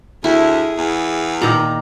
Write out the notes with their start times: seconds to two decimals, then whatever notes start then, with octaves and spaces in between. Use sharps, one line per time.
0.24 D2 E4 G#4
0.78 E2
1.42 A#2 D#3 A#5